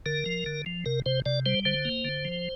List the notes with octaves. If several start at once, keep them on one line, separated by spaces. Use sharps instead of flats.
D3 A#4
F3
D3
F3
C3 A#4
C3 C5
C3 D5
G3 C5
D3 C5
A#3
D3
F3